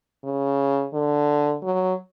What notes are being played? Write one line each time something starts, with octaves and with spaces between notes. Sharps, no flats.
C#3
D3
F#3